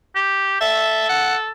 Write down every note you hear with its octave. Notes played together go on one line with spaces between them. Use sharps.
G4
A4 E5
F#5